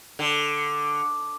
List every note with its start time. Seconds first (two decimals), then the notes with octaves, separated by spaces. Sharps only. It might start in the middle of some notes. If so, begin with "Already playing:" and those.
0.19 D3